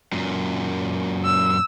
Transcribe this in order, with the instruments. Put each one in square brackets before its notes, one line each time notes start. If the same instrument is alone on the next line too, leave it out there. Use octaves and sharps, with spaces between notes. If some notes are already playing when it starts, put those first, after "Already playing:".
[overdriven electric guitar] F#2 A#2
[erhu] E6